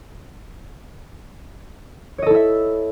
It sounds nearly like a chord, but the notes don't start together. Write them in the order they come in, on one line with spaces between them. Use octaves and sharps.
C#5 D#5 A4 E4 E5